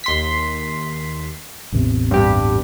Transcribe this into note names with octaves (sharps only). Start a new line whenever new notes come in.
D#2 C6 B6
A1 E2 C3
G2 G4